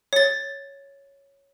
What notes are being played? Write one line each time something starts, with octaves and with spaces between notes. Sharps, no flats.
C#5 A6